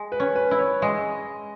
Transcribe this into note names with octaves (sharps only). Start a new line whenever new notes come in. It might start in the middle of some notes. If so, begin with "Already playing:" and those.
Already playing: G#3
B4
C#4
B4
E4
C#5
G#3 D#5